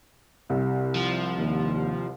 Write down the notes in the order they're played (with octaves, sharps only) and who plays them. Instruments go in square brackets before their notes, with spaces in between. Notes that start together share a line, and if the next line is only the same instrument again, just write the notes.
[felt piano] C2 C3
[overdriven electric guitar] F3
[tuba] D#2